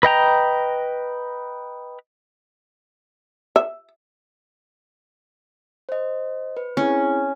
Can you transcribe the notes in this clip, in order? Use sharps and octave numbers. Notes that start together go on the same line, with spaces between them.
B4 D#5 G5 A#5
E5
C5 D#5
B4
C4 C#4 E4 G#4